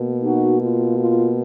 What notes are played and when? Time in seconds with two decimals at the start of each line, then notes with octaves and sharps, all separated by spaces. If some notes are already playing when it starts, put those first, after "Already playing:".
Already playing: B2 A#3
0.22 D#4 F#4
0.60 F4
0.97 F4